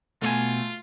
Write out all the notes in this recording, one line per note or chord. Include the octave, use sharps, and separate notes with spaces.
B2 A3 F4 C#5 G#5